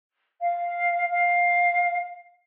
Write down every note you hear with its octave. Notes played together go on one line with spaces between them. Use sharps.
F5
F5